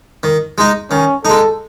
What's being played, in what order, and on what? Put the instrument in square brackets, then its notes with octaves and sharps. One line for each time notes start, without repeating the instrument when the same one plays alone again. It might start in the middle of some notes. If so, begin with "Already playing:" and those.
[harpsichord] D#3
G#3 D#4
[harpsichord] D#3 [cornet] C#4
[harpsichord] G#3 D#4 [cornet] A4